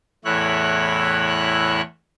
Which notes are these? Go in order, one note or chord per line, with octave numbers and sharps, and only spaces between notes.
E2 A2 E4 C#5 F#6